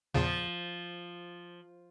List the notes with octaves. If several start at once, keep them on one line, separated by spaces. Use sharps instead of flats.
E2 A#2 C#3 F3